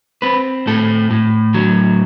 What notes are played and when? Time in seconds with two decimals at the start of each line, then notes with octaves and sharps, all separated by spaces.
0.22 C4 B4
0.67 A2 A4
1.11 A2
1.54 F#3